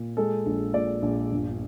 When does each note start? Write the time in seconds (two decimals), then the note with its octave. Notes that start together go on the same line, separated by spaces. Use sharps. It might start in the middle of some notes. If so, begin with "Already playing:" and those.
Already playing: A#2
0.17 G#3 A4
0.46 A#1
0.74 A#2 D5
1.02 A#1
1.32 G1